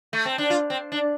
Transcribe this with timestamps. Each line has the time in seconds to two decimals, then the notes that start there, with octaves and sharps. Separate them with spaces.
0.13 A3
0.25 C4
0.38 D4
0.50 F4
0.70 C4
0.92 D4